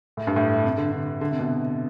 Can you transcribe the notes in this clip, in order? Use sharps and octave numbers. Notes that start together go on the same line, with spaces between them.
A2
G2
A2
C3
D3
D3
D3
C3
B2